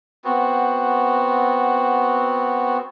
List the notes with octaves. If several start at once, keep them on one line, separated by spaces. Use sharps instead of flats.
B3 C4 F#4